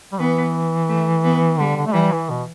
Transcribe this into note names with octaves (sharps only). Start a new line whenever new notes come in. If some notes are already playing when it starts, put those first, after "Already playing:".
G3
E3 B3
A3
B3
D3 G3
D3
A3
E3 G3
E3
B2